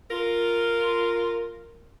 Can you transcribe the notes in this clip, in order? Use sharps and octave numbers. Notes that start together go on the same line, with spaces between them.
F4 A#4